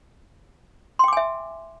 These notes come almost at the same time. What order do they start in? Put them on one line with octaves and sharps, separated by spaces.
C6 G5 D6 G#5 E5